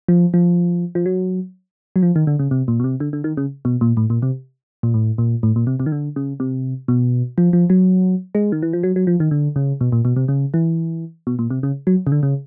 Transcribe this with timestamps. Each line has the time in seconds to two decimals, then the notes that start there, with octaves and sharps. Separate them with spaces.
0.08 F3
0.34 F3
0.95 F3
1.06 F#3
1.96 F#3
2.03 F3
2.16 D#3
2.27 D3
2.39 C#3
2.51 C3
2.68 A#2
2.80 B2
2.84 C3
3.00 D3
3.13 D3
3.24 D#3
3.37 C#3
3.65 B2
3.81 A#2
3.97 A2
4.10 A#2
4.22 C3
4.83 A#2
4.94 A2
5.18 A#2
5.43 A2
5.56 A#2
5.67 C3
5.80 C3
5.86 D#3
5.92 D3
6.16 C#3
6.40 C3
6.88 B2
7.38 F3
7.53 F3
7.70 F#3
8.35 G#3
8.52 D#3
8.63 E3
8.73 F3
8.83 F#3
8.96 F#3
9.07 F3
9.20 D#3
9.31 D3
9.56 C#3
9.81 B2
9.92 A#2
10.05 B2
10.16 C3
10.28 C#3
10.54 E3
11.27 B2
11.39 A#2
11.50 C3
11.63 C#3
11.87 F#3
12.07 C#3
12.12 D3
12.23 C#3